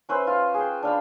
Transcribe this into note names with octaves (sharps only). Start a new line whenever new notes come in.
C#4 B4 C5 E5
F4
G#4 G5
D4 F5 B5